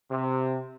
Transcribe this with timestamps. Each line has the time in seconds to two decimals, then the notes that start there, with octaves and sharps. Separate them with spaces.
0.10 C3